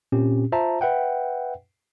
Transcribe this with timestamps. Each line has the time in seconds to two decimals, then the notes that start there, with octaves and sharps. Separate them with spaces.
0.12 A#2 C4 C#4 G4
0.52 F4 C5 E5 A5 A#5
0.81 B4 E5 F#5 G5